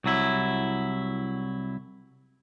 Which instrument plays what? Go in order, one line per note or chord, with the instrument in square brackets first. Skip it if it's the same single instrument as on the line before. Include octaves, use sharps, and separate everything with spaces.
[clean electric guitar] C2 F#3 E4